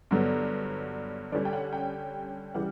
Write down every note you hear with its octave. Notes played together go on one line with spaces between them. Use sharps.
G2 D3 F#3 B3
D3 G3 C#4 D5
G5
F#5
G5
C#3 E3 G3 F#5